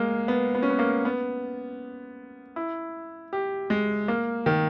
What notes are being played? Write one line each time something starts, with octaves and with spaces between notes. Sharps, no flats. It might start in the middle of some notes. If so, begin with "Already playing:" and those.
Already playing: G#3 A#3
B3
B3
C#4
B3
A#3
B3
E4
G4
G#3
A#3
D#3